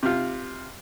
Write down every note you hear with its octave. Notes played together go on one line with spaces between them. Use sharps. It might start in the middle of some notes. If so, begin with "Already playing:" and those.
C3 F4